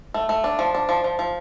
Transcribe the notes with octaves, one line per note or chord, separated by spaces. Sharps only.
A3
A3
D4
F3
D4
F3
F3
F3